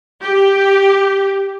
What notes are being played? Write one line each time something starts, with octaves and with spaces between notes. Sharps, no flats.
G4